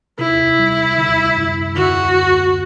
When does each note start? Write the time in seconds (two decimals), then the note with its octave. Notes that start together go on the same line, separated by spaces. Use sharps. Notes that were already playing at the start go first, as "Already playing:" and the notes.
0.19 C3 E4
0.59 G3
0.98 D3
1.37 F#2
1.76 D3 F#4
2.15 D3